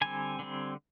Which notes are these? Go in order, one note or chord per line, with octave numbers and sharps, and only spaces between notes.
D3 G3 C4 G#5
D3 G3 C4